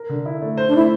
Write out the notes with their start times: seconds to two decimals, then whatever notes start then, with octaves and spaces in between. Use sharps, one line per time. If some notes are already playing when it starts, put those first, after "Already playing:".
Already playing: A#4
0.09 D3
0.26 E4
0.42 A3
0.57 C5
0.66 D4
0.74 A3 E4